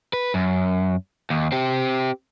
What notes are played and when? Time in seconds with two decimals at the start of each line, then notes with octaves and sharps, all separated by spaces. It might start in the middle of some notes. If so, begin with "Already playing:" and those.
0.13 B4
0.34 F#2
1.30 D#2
1.52 C4 G4